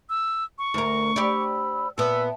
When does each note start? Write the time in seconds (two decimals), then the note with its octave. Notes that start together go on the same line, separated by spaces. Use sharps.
0.09 E6
0.58 C#6
0.74 D2 A#4
1.16 G4 C5 D5 B5 E6
1.98 A#2 B3 E5 G5 A5 E6